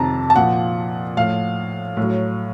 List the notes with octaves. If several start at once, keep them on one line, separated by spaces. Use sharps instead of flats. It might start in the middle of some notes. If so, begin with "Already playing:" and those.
Already playing: F2 C3 D#3 A5 A#5
A5
A#2 F3 F#5
A2 F3 F5
A2 F#3